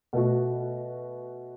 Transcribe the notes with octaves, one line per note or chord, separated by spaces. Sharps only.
B2 A3 F#4